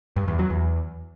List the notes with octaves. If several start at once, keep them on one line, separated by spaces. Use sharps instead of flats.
G2
E2
F#3
E2